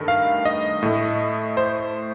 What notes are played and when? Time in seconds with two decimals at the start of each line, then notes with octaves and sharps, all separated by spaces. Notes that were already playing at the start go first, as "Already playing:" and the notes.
Already playing: G2 D#3 A3
0.08 F5
0.45 D#5
0.82 A2 A3
1.57 C5